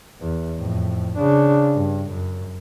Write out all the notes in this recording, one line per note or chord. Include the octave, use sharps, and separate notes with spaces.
E2
F2 A2
C#3 D4
G2
F#2